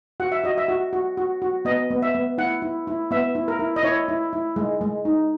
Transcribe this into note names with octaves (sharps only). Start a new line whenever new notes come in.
F#4 F#5
E5
F#4 D#5
E5
F#4
F#4
F#4
F#4
B3 D#5
B3
E5
B3
E4 F#5
E4
E4
B3 E5
E4
A#4
E4
D#5
E4 C#5
E4
E4
G#3
G#3
D#4